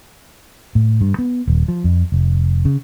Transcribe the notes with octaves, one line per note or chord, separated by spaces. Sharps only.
A2
G2
B3
D#1
F3
F2
F1
C#3